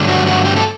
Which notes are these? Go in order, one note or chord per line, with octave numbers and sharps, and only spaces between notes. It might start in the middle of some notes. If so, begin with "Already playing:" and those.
Already playing: G2 D3 F#3 A3
F#4
F#4
G4
A4